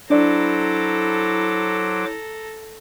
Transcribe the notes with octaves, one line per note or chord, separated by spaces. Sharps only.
F#3 D4 E4 A4 C5 D5 A#5 D6